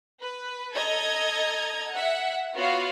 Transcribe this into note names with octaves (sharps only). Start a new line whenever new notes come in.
B4
A4 D#5 A#5 G#6
E5 F#5
B3 F4 F#4 C#5 F5